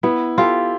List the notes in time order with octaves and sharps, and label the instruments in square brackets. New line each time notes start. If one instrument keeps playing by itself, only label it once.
[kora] B3 [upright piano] E4
[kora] F4 A4 [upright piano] G4